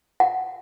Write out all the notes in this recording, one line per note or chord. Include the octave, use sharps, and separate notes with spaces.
F#5